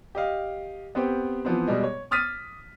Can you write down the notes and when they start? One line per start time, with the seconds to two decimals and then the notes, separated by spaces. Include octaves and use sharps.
0.15 G4 D#5 F5
0.95 B3 C4 G4
1.45 E3 F3 B3 C4
1.67 B2 G3 G#3
1.84 C#5
2.11 D6 D#6 F6 A6 B6 D#7